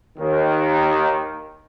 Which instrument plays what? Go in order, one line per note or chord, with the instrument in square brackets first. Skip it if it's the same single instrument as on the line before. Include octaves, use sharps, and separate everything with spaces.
[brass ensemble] D#2 D#3